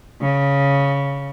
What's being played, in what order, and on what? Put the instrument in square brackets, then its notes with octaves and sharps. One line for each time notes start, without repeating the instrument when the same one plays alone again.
[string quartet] C#3